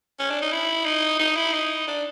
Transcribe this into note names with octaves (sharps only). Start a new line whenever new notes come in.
C#4
D4
D#4
E4
D#4
D#4
E4
D#4
D4